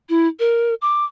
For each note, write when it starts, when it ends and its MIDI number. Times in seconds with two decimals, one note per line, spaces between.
0.09 0.28 64
0.39 0.74 70
0.82 1.04 86